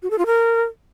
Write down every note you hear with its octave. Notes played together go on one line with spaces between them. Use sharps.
F#4
A4
F4
A#4